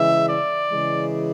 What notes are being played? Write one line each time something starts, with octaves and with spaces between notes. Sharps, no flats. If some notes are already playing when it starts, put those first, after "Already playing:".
Already playing: C#3 E3 G#3 E5
D5
C#3 E3 G#3